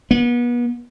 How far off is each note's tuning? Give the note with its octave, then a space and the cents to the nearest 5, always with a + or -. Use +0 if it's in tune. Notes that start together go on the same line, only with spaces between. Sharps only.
B3 -35